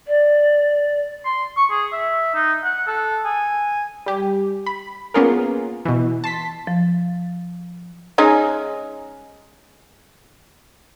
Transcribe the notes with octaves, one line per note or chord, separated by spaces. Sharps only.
D5
C6
C#6
G#4
E5
D#4
F#5
A4
G#5
G3 G4
B5
A#3 B3 C#4 F4 G#4 A#4
B2 E3
A5 C6 B6
F3
G#3 C#4 D#4